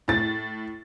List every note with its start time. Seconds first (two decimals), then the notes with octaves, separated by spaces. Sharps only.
0.08 A2 A6